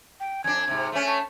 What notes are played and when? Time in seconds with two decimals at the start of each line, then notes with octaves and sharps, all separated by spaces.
0.20 G5
0.44 F2 D4 G#6
0.68 G#2 C3
0.92 A3 C#4
1.07 A5